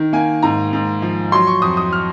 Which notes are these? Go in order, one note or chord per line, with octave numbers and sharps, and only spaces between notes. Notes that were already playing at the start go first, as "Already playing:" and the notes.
Already playing: D#3
A#3 G#5
G#2 A#5
G#2
F3
F#3 C6
C#6
F2 D#6
D#6
F6